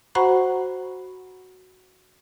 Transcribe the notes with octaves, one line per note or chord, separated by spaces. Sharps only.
F#4 C5 F#5 A#5 B5 C#6